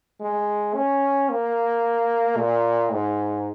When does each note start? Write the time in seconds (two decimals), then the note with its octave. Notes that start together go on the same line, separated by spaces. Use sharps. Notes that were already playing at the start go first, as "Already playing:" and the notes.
0.21 G#3
0.75 C#4
1.30 A#3
2.37 A#2
2.92 G#2